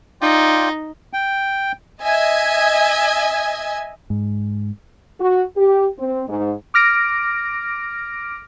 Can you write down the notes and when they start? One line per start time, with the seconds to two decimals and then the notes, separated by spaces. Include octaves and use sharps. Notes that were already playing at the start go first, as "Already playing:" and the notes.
0.21 D#4 F4 D5 G5
1.13 G5
2.02 D#5 E5 G#5 G#6
4.10 G#2
5.21 F#4
5.57 G4
5.99 C4
6.28 G#2
6.74 D6 F6 A#6 D7